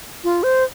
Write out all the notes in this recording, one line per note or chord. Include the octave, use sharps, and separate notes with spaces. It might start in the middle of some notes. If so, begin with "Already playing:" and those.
F4
C5